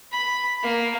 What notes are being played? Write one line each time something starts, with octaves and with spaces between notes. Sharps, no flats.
B5
A#3